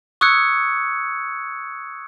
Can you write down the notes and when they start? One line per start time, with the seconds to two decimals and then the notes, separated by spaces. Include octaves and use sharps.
0.21 C#6 D#6 E6 F#6 G#6 C#7